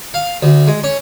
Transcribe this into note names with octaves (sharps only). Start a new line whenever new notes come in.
F5
D2
G#3
C#4